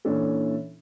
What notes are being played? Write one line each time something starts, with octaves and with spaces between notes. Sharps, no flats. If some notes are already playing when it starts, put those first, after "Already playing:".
A#2 E3 C#4 D4 E4 A4